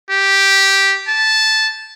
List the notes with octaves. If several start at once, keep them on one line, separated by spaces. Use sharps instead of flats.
G4
A5